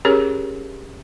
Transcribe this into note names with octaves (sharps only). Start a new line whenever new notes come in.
C#4 G4 G#4 A#4 C#5